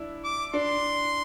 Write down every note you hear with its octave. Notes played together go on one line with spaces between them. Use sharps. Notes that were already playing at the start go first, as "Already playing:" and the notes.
Already playing: D4 E4
D6
D4 C6